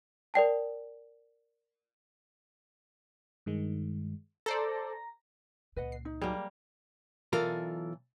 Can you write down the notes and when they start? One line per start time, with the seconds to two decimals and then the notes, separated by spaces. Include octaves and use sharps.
0.34 A#4 D5 G5 A5
3.46 G2 D#3 G#3
4.46 A4 C5 D5 A#5 A#6
5.76 C#2 A#2 B4 D#5 F#5
5.92 C7
6.05 D#4
6.22 F#3 G3 A#3 G#4
7.33 B1 E3 F4 A4 A#4